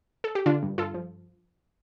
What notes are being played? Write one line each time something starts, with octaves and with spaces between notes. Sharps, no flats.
A4
G4
D3 D4 F4
G2
G2 F4 A4
F3